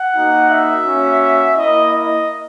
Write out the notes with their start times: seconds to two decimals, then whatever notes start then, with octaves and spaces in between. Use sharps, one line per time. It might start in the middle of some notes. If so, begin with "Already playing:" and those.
Already playing: F#5
0.15 A#3 D#4 F#4
0.51 E5
0.86 A#3 C#4 F#4
1.57 A#3 E4 D#5
1.93 D#5